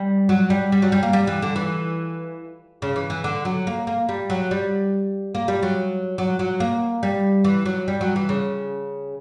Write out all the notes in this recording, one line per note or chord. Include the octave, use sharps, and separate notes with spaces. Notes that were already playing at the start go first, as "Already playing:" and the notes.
Already playing: G3
F#3
G3
G3
F#3
G3
A#3
G3
E3
D3
E3
C#3
E3
E3
D3
F#3
A#3
A#3
G3
F#3
G3
A#3
G3
F#3
F#3
F#3
A#3
G3
E3
F#3
G3
F#3
E3
C#3